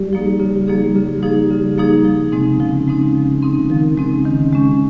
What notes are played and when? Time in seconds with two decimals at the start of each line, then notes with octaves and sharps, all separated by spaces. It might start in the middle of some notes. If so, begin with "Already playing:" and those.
Already playing: G3
0.13 F3 A#3 D#4 G#4
0.40 C#3
0.68 F3 A#3 D#4 G#4
0.95 C#3 G3
1.22 F3 A#3 D#4 G#4
1.51 C#3
1.78 F3 A#3 D#4 G#4
2.05 F3
2.32 C3 G#3 C4 D#4
2.60 C#3 F3
2.88 G#3 C4 D#4
3.15 F3
3.43 G#3 C4 D#4
3.70 D#3 F3
3.97 C#3 G#3 C4 D#4
4.25 D#3
4.53 G#3 C#4